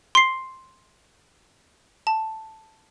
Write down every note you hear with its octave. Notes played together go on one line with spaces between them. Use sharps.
C6 C7
A5